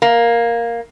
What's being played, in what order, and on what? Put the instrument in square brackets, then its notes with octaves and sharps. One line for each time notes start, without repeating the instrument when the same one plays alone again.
[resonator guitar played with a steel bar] A#3